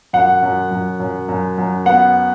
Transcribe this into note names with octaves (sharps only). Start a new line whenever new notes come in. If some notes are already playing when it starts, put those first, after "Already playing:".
F#2 F#5
F#2
F#2
F#2
F#2
F#2
B3 F#5